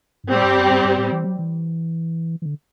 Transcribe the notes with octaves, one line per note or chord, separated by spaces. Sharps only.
G2
A2 G3 C4 G4
G2
F#2
G2
G2
A2
E3
F#3
E3
E3
D3